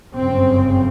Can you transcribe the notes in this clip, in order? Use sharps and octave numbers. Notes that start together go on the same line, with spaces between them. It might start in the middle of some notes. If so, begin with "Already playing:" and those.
G1 F#2 C#3 C4